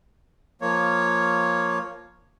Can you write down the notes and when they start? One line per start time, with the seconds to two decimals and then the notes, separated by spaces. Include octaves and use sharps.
0.62 F3 A#3 C#5